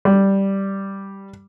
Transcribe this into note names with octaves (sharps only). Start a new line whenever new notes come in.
G3